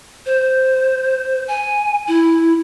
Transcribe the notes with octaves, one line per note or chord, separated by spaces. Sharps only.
C5
G#5
E4